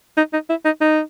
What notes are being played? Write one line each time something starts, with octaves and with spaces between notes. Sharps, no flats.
D#4
D#4
E4
D#4
D#4